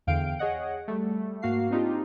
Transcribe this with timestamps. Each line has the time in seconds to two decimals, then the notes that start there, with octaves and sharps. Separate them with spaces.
0.07 E2 D3 F5 G5 D7
0.39 G#4 C#5 D#5 F#5
0.88 G3 A3
1.42 G#2 A#3 F#4 F5 C7
1.70 C4 D4 D#4 F4 G4